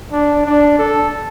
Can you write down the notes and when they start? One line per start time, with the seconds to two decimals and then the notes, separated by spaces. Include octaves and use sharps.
0.12 D4
0.45 D4
0.79 A4